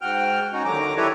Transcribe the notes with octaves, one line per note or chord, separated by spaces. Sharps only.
G#2 F#4 G5 F6
C#4 D#4 F#4
D#2 D3 F#3 A#5 D6
E4 G4 A4 B4 C#5